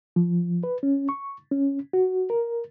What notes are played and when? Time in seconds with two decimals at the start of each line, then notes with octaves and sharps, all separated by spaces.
0.16 F3
0.63 B4
0.83 C#4
1.09 C#6
1.51 C#4
1.93 F#4
2.30 A#4